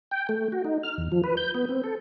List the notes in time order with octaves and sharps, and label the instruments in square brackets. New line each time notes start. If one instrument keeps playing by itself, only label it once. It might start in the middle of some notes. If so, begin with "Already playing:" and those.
[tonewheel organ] G5
A3
F#4
D#4
F6
E2
F3
B4
G6
B3
C4
A4